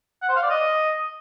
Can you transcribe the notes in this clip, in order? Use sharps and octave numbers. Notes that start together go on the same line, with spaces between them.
F#5
C5
F5
D5
D#5